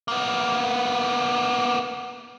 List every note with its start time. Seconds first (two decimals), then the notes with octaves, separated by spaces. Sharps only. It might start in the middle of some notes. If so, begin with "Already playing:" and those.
0.08 A#3 B3